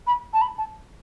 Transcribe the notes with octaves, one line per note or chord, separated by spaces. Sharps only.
B5
A5
B5
A5